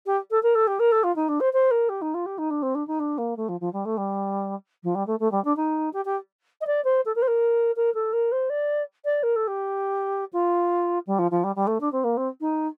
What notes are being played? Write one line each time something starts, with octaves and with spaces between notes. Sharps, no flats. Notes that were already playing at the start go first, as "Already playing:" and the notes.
G4
A4
A#4
A4
G4
A#4
A4
F4
D#4
D4
C5
C5
A#4
G4
D#4
F4
G4
D#4
D4
C4
D4
D#4
D4
A#3
A3
F3
F3
G3
A3
G3
F3
G3
A3
A3
G3
D4
D#4
G4
G4
D#5
D5
C5
A4
A#4
C5
A#4
A#4
A4
A#4
C5
D5
D5
A#4
A4
G4
F4
G3
F3
F3
G3
G3
A3
D4
C4
A#3
C4
D#4